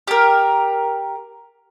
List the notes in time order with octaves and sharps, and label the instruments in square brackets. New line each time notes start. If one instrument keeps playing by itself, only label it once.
[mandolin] G4 A#4